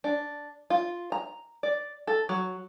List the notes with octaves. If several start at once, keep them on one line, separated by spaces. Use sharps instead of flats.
D4
F4
A#5
D5
A4
F#3